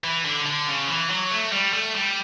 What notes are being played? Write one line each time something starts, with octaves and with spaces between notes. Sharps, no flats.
E3
D3
D3
C#3
E3
F#3
A3
G3
A3
G3